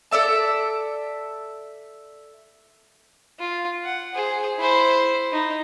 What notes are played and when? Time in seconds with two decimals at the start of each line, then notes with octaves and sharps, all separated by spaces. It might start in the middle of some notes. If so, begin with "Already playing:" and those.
0.11 A4 D5 E5 A5
3.39 F4
3.84 F#5
4.15 G#4 C5
4.58 E4 C5
5.32 D#4 E4